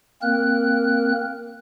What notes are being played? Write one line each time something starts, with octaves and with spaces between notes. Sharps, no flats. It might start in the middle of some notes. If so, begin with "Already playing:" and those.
A#3 C4 A#4 F#6